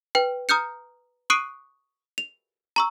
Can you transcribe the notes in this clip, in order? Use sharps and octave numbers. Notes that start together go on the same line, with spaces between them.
B4 G5
A#5 D#6 F6 G6 C#7
C#6 D#6 F#6 C7 D7 D#7
F7
A#5 C#6 E6